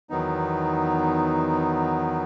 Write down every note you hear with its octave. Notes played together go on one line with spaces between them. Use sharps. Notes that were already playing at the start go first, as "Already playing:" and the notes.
E2 D#3 F#3 B3 D#4